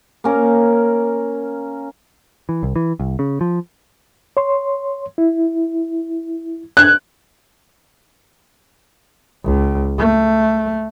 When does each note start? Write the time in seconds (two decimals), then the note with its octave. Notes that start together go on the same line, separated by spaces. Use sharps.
0.24 A#3 C#4 A#4
2.49 E3
2.63 C2
2.76 E3
2.99 C2
3.19 C#3
3.41 F3
4.37 C#5 C6
5.18 E4
6.77 F#6 G#6
9.44 C#2
9.98 A3